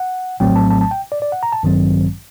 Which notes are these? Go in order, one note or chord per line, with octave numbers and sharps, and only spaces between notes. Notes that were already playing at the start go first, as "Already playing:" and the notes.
Already playing: F#5
A#1 A2 F#3 A3 C4 G5
A5
A5
A5
G5
D5
D5
F#5
A#5
A5
A1 G2 D#3 F#3 C4